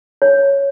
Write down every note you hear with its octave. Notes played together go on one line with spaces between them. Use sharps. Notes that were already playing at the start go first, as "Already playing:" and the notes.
C#5